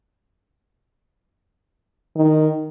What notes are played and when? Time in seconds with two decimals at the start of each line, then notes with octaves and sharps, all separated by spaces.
2.16 D#3